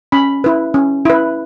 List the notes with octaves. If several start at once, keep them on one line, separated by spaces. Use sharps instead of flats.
C#4 B5
E4 B4
C#4
E4 B4